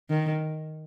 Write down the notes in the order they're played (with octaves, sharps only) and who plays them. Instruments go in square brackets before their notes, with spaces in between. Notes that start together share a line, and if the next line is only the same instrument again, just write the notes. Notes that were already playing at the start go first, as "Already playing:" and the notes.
[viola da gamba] D#3